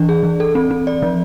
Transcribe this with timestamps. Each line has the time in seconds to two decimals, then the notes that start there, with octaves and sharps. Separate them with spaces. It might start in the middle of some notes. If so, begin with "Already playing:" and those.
Already playing: E3 D4 D5
0.09 G#4
0.23 E3
0.40 A4
0.55 C4
0.71 C4
0.87 D5
1.02 F3